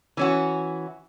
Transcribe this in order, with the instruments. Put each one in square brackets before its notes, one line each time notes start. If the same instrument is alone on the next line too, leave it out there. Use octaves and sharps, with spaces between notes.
[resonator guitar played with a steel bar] E3 C#4 F#4